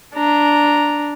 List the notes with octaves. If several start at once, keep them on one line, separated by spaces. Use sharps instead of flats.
D4 A#5